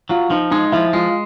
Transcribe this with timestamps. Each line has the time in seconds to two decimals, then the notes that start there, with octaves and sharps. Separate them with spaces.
0.09 F#3 F4
0.30 F3 D#4
0.51 G#3 D#4
0.72 F3 E4
0.93 G#3 F4